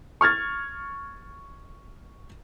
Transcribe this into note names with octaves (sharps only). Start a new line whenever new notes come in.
C#6 F6 G#6 A6